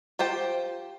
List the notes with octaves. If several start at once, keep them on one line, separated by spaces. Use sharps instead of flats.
F4 G4 C5 G5